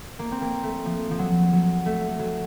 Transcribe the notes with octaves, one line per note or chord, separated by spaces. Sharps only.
A#3
C4
A#3
A3
F3
F3
F#3
F#3
A3
F#3